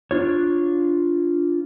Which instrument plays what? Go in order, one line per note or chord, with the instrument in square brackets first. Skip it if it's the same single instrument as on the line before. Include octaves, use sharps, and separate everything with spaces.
[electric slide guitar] D4 F4 C#5